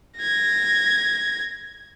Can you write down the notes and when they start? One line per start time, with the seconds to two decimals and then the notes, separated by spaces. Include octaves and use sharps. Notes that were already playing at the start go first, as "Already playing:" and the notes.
0.18 G#6 A#6